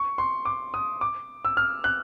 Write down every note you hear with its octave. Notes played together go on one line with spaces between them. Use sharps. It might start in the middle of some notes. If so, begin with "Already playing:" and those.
Already playing: C#6
C6
D6
D#6
D6
E6
F6
F#6